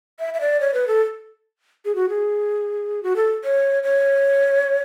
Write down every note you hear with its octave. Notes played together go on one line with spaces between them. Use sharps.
E5
E5
D5
C#5
B4
A4
G#4
F#4
G#4
F#4
A4
C#5
C#5